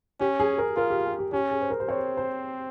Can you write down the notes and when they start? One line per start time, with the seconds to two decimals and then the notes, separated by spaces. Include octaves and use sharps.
0.20 C#4 G4
0.40 G#4
0.58 A#4
0.77 F4 A#4
0.91 G4
1.05 G#4
1.19 G4
1.33 C#4 G4
1.51 G#4
1.61 C5
1.70 A#4
1.80 C5
1.89 C4 C#5
2.17 C5